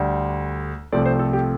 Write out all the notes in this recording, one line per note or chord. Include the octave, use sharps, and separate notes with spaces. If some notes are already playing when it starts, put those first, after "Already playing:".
Already playing: D2 D3 G3
C2 C3 F3 A3 C4 D5
C5
A4
G4